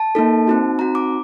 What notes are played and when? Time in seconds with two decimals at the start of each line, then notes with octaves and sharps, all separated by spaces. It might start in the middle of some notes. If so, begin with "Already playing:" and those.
Already playing: A5
0.15 A#3 D#4 A4
0.47 C4 D#4 F#4
0.79 C4 D#4 F#4 A#5
0.95 D6